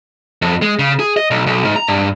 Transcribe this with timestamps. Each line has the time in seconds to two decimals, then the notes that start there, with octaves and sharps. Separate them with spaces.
0.42 F2
0.62 G#3
0.79 C#3
1.00 G#4
1.17 D#5
1.31 B1
1.46 B1
1.65 G#2
1.76 A#5
1.88 G2